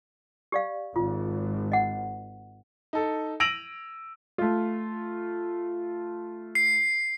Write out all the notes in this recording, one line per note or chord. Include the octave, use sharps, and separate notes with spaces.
G4 D5 F5
G#1 F4
D#5 F#5
D#4 A4
E6 A#6 D7 D#7 F7 F#7
A3 F4
C7